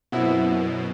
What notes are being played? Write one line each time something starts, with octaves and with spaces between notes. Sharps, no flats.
F#2 B2 C4 E4 F#4